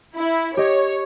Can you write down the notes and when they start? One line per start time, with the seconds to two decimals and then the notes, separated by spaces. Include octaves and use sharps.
0.16 E4
0.57 G4 C#5 D#5